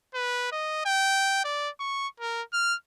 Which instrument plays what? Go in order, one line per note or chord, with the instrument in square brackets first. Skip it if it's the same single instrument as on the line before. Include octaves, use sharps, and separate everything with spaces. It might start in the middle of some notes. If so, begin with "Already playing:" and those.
[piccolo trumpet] B4
D#5
G5
D5
C#6
A#4
F6